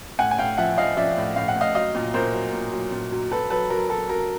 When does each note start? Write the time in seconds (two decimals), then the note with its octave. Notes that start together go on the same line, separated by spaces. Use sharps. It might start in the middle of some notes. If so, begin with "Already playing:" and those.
0.19 A2 F#5 G#5
0.31 G#5
0.38 A2 F5 G5
0.58 F3 E5 F#5
0.78 F3 D#5 F5
0.97 F3 D5 E5
1.17 A2
1.36 A2 F5
1.48 F#5
1.56 A2
1.61 D#5 F5
1.75 F#3 D#5 F5
1.95 A#2
2.14 A#2 A#4 C5
2.34 F#3
2.53 A#2
2.73 F#3
2.92 A#2
3.12 F#3
3.32 F#3 A4 B4
3.50 F#3 A4 B4
3.70 F#3 A#4
3.90 F#3 A4
4.09 F#3 A#4